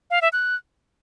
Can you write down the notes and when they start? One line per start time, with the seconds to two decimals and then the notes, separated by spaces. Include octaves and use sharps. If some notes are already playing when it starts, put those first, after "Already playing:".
0.11 F5
0.22 E5
0.33 F#6